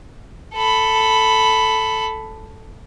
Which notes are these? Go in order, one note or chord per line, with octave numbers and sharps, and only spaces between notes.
A4 B5